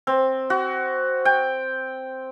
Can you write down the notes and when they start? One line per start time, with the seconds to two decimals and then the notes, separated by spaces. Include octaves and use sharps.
0.07 C4
0.50 F#4
1.25 G5